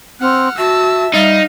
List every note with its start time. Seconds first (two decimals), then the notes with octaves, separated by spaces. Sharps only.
0.21 C4 F#5 F6
0.58 F#4 E5 A5 E6
1.14 G3 D#4 F5